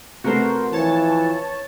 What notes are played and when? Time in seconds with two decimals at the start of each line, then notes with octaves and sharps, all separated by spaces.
0.24 C3 A3 B3 F#4 A#4 C5
0.73 E3 F3 C#5 A5